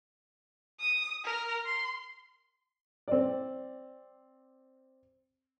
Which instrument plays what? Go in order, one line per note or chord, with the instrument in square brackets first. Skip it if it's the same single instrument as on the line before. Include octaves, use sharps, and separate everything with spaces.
[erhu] D#6
A#4
C6
[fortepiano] C4 D5